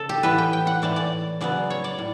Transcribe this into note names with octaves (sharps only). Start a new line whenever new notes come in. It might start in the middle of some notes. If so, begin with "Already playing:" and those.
Already playing: C#3 A4
G4
A2 E3 B3 B4
G5
G5
F#5
A2 E3 A3 D5
D5
C#3 F#3 B3 D5
C#5
D5
A2